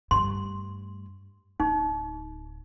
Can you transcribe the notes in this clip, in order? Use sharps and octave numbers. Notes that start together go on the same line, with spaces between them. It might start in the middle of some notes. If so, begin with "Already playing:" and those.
G2 A3 C6
D1 D#4